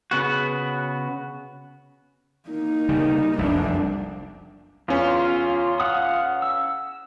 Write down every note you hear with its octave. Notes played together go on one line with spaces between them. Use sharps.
C#3 B3 F#4
A#3 D#4
C#3 G3
F1 C2 F#2 D4
E2 C#4 F4
F5 F#5 D#6
E6